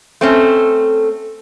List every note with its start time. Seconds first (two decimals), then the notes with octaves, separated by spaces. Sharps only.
0.21 A3 C4 C#4